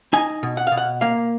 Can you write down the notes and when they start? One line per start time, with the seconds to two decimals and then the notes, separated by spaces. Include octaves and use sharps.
0.13 D#4 G#5
0.43 B2
0.57 F#5
0.67 F5
0.72 B2
0.77 F#5
1.01 A#3 F5